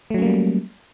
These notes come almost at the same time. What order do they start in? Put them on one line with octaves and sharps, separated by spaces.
A3 F#3 C#4 A#3 G3